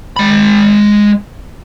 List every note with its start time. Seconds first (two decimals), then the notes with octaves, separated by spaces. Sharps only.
0.16 G#3 B5